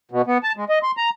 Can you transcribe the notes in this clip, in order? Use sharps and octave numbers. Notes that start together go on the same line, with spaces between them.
B2
B3
A5
G#3
D#5
C6
A#5